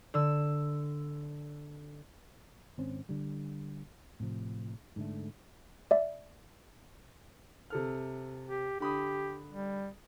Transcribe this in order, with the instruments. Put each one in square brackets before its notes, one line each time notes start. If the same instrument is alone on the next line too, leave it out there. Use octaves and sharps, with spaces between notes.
[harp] D3 E6
[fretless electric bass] G#1 C4 C#4
D3 G3
A2 C3 F3
G#2 D3 A3
[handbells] D5 E5
[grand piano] C3 A4 F6
[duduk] G4
[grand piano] D3 B5 D#6 [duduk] G4
[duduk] G3